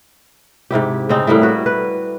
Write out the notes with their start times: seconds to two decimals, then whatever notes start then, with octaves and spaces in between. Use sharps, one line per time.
0.71 G#2 C3 E4 G4
1.09 C#3 C4 D#4
1.27 A2 G3 A#3 E4
1.42 G3 F#4 B4
1.66 B4